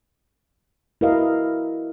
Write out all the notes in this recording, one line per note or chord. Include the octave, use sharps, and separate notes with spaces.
E4 F#4 A#4 B4 D#5 F5